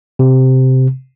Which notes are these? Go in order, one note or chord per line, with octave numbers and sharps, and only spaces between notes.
C3